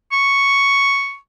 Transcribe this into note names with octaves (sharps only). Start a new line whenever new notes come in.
C#6